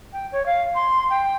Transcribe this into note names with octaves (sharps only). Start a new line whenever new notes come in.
G5
C#5
F5
C6
G5